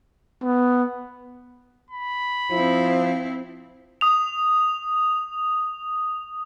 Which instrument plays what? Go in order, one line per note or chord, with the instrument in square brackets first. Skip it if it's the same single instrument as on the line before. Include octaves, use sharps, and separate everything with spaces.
[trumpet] B3
[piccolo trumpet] B5
[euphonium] F3 [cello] C4 E4
[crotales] D#6 F7